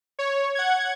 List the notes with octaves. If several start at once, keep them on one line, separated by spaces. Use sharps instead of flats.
C#5
F#5 G#6